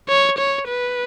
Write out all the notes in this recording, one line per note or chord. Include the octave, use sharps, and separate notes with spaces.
C#5
C#5
B4